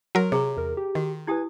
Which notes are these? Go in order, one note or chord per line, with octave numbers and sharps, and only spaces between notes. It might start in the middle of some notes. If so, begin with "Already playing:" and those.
F#3 F#4 A#4
C3 G#4 C#5 A#5 C#6
E2 A#4
G4
D#3 F#4
E4 G4 B4 G#5 D#6 G#6